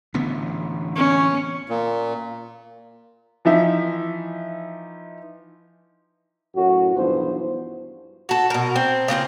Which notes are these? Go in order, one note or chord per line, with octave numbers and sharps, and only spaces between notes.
A1 D3 B3
C#4
A#2
E3 F3 D#4 E5
F#2 A2 F#4
B1 G2 E3 F3 B3 C5
F#4 A4
B2 A#4
C4
C#3 A#3 C4 F4